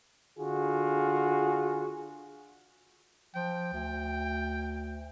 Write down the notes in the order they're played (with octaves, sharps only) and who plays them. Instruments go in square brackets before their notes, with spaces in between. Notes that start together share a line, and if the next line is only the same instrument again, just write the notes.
[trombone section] D3 F4 F#4 G#4
[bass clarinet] F3 [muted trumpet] G5
[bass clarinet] D2